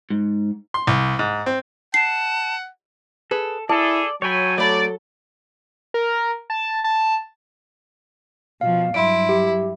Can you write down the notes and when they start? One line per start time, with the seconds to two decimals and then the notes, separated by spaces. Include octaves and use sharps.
0.10 G#2
0.74 C6
0.87 C2
1.19 G#2
1.46 C4
1.94 F#5 A5 C7
3.31 G#4 A4 B4
3.69 E4 G#4 A4 D5 A5
4.22 F#3 A4 C#5 G5 G#5 B5
4.58 A3 A4 C#5 D5 B5
5.94 A#4
6.50 A5
6.84 A5
8.61 B2 F3 F5
8.94 G2 F#3 E4 C6 D7
9.29 G4